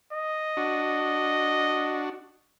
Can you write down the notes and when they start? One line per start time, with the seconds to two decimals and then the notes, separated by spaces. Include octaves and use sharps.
0.13 D#5
0.57 D4 F#4